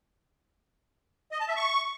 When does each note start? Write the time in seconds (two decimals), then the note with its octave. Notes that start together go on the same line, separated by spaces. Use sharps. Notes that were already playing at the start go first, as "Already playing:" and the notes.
1.32 D#5
1.40 A5
1.48 E5
1.56 C#6